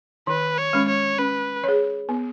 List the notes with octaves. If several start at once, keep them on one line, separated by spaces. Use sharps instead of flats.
D#3 B4
C#5
G#3 C#4
C#5
C#4 B4
G#4 C#5
B3